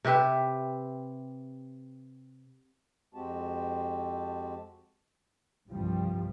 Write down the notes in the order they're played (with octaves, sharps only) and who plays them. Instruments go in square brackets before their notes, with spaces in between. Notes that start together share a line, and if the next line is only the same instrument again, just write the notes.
[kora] C3 G4 B4 E5
[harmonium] F2 G#3 C4 F#4 G4 A5
[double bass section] C2 G2 F3 G3